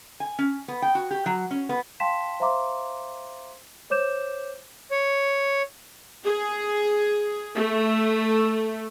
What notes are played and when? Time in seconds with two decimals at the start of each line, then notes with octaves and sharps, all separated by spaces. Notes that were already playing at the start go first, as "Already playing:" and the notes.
0.20 G#5
0.39 C#4
0.68 B3
0.82 G5
0.95 F#4
1.11 G4
1.26 F#3
1.51 C#4
1.69 B3
2.00 F5 G5 A5 C6 B6 E7
2.40 C5 E5 F5 A#5 C6 D6
3.90 C5 C#5 D6 G6 E7
4.91 C#5
6.25 G#4
7.55 A3